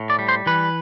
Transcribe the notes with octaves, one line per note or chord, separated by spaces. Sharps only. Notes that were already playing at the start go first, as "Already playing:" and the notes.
Already playing: A2
D5
G3
C5
E3 B4